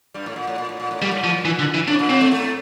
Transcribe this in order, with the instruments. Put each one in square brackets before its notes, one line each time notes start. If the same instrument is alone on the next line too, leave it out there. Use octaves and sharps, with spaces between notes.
[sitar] G2 G3
A2
A#2
A2
A#2
A2
A#2
A2
[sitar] A#2 [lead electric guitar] G3
[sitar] A2
[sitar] A#2 [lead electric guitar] F3
[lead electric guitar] E3
D3
E3
[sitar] A2 [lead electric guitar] D4
[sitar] C3
A#2
[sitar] C3 [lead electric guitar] C4
[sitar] A2 A3
A2 A3